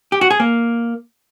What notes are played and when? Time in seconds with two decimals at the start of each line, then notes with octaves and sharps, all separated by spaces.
0.12 G4
0.21 F#4
0.31 G#4
0.40 A#3